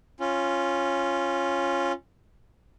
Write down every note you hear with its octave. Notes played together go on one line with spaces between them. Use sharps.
C#4 F4